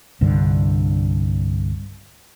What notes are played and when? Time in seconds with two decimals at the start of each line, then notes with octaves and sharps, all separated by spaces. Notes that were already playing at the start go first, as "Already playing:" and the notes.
0.21 C2 G2 D3